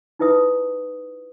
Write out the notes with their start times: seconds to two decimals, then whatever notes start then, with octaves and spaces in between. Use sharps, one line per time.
0.19 D#4 E4 B4 E5 D#6